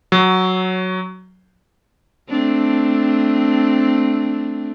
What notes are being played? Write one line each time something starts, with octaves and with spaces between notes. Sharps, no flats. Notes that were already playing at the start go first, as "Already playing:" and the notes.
F#3
A3 C4 D4